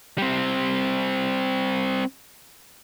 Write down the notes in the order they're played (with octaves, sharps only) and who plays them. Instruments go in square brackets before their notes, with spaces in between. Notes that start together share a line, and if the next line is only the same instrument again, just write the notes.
[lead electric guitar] G3 C4